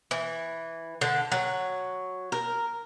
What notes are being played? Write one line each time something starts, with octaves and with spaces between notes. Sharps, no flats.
E3
D3
F#3
A#4